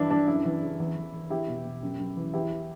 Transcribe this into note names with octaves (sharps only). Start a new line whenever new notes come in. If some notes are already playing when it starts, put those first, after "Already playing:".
Already playing: G2 E3 D4 E4
G2 D4
F#2 E4
E3
C#3
E2
E2
E2
E2 E4 G4
B2
B2
F#2
F#2
E3
E2 E4 G4